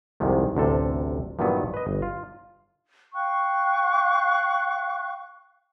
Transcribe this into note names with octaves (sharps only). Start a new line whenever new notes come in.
C2 F2 G#2 C3 D#3
A1 D2 C3 A4
G2 A#2 D#3 E3 F#3 B3
B4 D#5
G1
F4
F5 G5 C#6 F#6